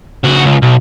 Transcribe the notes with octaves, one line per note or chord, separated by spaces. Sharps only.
C#2 F#4
C#2
B1